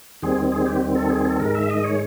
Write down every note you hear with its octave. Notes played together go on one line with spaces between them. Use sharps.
D#2 D#3 G3 C4 G#4
G#4
G4
A4
G#4
A4
G#2 D#3 G#3 A#4
E5
D#5
C#5